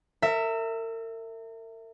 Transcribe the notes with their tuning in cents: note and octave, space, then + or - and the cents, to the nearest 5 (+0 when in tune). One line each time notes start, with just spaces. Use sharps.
A#4 -40 E5 +0